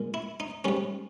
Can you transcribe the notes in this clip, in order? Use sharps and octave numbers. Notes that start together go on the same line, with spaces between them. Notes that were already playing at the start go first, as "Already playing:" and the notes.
Already playing: A#2 G#3
E4
D#4
G#2 G3 C#4